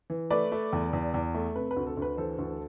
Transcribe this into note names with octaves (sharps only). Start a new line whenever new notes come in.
E3
A3 B4 D5
A3
E2
E2
E2
A3
C3 B4
B4
D2
A4
D2
B4
E3 A4 C5
D2